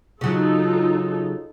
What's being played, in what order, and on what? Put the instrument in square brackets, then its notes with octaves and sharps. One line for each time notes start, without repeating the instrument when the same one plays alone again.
[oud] C#3 F#3 [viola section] D#4 F4 A4